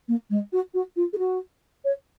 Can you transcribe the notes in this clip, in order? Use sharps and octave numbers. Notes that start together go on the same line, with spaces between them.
A#3
G#3
F#4
F#4
F4
G#4
F#4
C#5